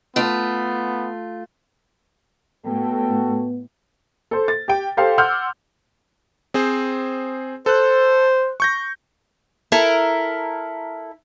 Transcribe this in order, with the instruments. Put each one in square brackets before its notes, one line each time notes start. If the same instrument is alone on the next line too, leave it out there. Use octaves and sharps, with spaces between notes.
[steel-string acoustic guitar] A3 F4 [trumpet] B3
[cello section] A2 [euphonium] B3 [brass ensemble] F#4 A4 G5
[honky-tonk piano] A4 C5
A6
G4 G5
G4 A4 C5 F5
F#5 C6 D6 E6 F6 G6
[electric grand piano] C4 G#4 C5
[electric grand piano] A4 F#6 [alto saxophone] C5
[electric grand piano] C#6 G6 A#6
[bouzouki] E4 A4 A#4